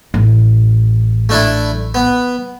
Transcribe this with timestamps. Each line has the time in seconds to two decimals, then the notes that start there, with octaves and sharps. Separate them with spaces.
0.14 A1
1.29 A3 D4 E4
1.95 B3